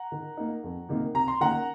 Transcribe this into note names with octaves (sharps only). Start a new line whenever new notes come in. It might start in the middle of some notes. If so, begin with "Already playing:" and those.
Already playing: F#5 A#5
D#3
A#3 D#4
F2
C3 D#3 A#3 D#4
C3 A#5
C6
D#3 A#3 C#4 F#5 A#5